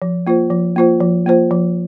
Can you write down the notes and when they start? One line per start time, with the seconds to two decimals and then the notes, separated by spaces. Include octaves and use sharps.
0.02 F3
0.27 A#3 F4 C5
0.50 F3
0.76 A#3 F4 C5
1.00 F3
1.26 A#3 F4 C5
1.51 F3